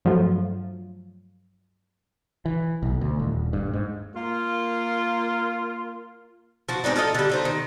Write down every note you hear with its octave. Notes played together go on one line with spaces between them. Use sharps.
G2 F3 F#3 A3 F4
E3
B1
D2
D#1
G2
G#2
A#3 F4
F3 F#4
G#3 C4 D4 D#4
F3 F4 A4 D#5
D3 G3
A3 D#4 C5
D#3